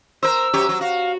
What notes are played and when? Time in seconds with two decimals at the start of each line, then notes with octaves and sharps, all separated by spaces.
0.23 A#4 C5 E6
0.54 F#2 G4 C#5
0.69 F#3
0.81 F#4 F5